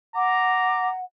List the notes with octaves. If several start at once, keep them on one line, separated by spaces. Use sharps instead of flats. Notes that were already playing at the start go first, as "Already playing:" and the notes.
F#5 A#5 D6